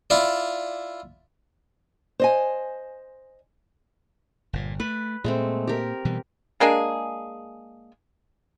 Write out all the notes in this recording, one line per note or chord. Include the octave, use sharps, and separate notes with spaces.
E4 F4 D5
C5 D#5 G#5
G1 A#2
A3 B4
A#2 G#3 A3 C4
G4 A#4
B2 E3 G3
G#3 A#3 D4 G#4